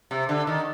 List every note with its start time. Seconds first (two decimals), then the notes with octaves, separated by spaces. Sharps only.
0.11 C3
0.29 D3
0.47 D#3